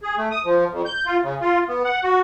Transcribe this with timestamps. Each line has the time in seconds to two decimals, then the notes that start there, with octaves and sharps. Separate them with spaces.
0.03 G#4
0.18 A3
0.31 D#6
0.45 F3
0.72 F2
0.85 G6
1.06 F4
1.23 C#3
1.41 F4
1.69 B3
1.85 F#5
2.04 F#4